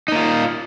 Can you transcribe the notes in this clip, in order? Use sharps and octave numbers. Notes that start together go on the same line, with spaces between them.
A#3 D#4 F4